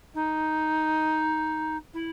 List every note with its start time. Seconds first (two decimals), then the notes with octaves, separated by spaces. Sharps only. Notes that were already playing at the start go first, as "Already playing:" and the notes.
0.14 D#4
1.93 E4